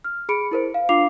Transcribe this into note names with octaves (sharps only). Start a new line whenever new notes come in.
F6
G#4 B5 C#7 D7
E4 A#4 C5
F5
D4 F4 F5 D6 C7 F7